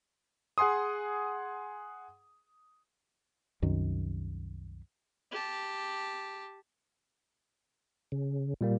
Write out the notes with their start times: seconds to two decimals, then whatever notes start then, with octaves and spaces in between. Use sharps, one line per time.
0.58 G#4 F#5 G#5 C6 D#6
3.62 C2 F#2 D#3
5.31 G4 A5
8.12 C#3
8.61 A#2 G3 A#3